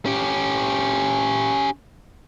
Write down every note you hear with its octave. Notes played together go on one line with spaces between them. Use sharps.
C#4 G4